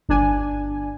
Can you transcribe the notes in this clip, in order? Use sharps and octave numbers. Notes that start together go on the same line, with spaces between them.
G1 D4 G#5